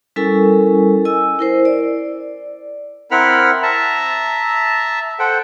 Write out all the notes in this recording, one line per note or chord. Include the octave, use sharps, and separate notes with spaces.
G3 C#4 E4 A4 A#4 G#5
D#5 G#5 E6
E4 A#4 C5
D5
C4 E4 A#4 F#5 B5 F6
E5 A5 A#5
A4 C5 F#5 G5